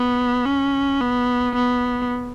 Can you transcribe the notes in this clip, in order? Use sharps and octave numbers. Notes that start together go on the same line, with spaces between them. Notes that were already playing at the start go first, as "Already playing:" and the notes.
Already playing: B3
C#4
B3
B3